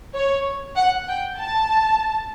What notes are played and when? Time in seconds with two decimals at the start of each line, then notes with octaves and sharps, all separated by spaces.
0.14 C#5
0.76 F#5
1.08 G5
1.39 A5